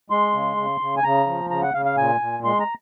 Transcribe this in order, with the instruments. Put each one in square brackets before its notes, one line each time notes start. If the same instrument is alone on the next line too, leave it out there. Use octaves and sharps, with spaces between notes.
[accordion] G#3 C6
C#3
C#3
C#3
G#5
C#3 A#5
F3
C#3 A#5
F#5
C#3 F5
F5
A#2 G#5
A#2
G#3 C6
A#5